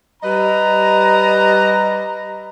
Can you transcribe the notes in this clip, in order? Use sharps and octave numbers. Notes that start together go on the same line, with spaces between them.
G3 B4 D#5 A#5